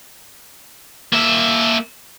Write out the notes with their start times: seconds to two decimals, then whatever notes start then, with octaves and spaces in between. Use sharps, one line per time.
1.13 A#3 E5